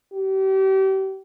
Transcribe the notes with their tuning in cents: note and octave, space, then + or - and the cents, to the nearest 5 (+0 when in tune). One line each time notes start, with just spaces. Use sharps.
G4 -35